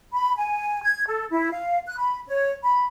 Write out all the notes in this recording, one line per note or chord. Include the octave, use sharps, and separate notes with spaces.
B5
G#5
G#6
A4
E4
F5
F#6
B5
C#5
B5